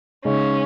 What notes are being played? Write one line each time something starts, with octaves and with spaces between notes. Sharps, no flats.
C#3 G#3 C#4 D#4